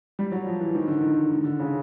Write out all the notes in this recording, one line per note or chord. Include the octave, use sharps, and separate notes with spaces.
G3
F#3
F3
E3
D#3
D3
D#3
D#3
D3
C#3